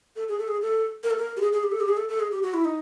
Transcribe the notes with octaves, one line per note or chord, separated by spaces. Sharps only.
A4
G#4
A4
G#4
A4
A#4
A4
A#4
G4
G#4
G#4
G4
A4
G4
G#4
A4
A4
G#4
G4
F#4
E4
D#4